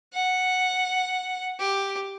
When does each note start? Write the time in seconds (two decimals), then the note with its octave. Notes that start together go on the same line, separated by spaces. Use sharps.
0.14 F#5
1.59 G4